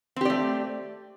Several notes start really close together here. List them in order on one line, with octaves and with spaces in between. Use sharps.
C4 G4 D5 A3